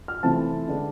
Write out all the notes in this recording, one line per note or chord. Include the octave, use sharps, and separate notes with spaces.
F6
C3 E3 A3 C4 F4 A5
D3 G#3 B3 D4